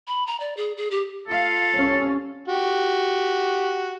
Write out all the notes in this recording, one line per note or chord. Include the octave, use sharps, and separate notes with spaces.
B5
A#5
D5
G#4
G#4
G4
F4 A4 F5
C2 C#4
F#4 G4